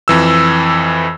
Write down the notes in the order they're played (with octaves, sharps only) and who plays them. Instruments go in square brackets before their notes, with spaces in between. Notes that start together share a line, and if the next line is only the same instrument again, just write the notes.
[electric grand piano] F2 E3 E6